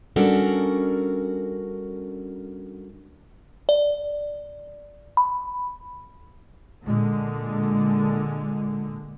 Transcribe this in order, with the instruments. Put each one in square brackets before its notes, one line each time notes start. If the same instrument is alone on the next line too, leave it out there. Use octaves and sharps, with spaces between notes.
[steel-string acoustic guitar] G3 C#4 D4 F#4 A4 A#4
[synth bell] D5
B5
[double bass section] A#2 D3 G#3